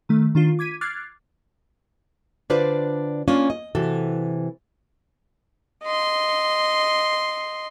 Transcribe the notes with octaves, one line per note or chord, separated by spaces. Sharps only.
D#3 A3
D#3 D4 F4
D6 G#6 B6 D#7
D6 F6 F#6 G#6 A6 C7
D3 D4 F4 B4 C5 D5
A#3 C#4 D4 F4
D#5
C3 E3 F#4 A4
D#5 C6